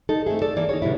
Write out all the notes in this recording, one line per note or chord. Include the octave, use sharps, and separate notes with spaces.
D#4 A4
A3 C4 G#4
A4 D5
E3 A#3 A4 D5
D#4 G#4 C#5
B2 D3 G3 E4